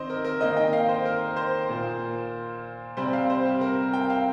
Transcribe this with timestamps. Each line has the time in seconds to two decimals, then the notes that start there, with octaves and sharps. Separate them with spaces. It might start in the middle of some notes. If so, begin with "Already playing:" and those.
Already playing: D#3 C4 C5 D#5
0.10 A#4
0.25 A#4
0.40 D#3 A#3 D#5
0.57 G5
0.73 F5
0.89 C5
1.05 A#4
1.37 C5
1.69 A#2 A#3
2.97 C3 G3 C4 C5
3.13 F5
3.30 C5
3.45 G4
3.61 A#4
3.93 G5
4.10 F5